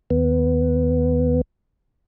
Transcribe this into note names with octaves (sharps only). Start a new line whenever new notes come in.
D#2 B3